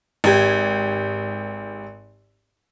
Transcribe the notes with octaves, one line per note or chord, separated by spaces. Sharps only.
G#1 G4 G#6